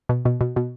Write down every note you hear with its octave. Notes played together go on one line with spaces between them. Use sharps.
B2
B2
B2
B2